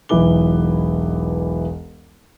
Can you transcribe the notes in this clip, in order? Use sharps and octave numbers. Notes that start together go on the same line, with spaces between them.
E1 B1 E3 B4 D6 G7